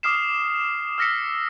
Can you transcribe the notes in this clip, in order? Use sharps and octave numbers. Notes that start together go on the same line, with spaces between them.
D6 D#6 F6 C7 E7
E6 F6 A#6 B6 C#7